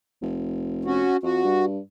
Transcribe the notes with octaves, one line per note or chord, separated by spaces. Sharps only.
F1
C#4 F#4
F2 F#4
G2